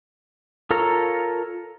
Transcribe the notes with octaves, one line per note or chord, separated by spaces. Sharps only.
F4 A4 A#4 C#5 A#5